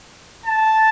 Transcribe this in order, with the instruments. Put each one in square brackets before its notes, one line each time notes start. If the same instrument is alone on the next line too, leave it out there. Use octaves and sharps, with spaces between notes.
[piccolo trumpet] A5